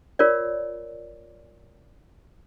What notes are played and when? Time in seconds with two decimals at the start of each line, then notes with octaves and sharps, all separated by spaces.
0.19 F4 A#4 C#5 D5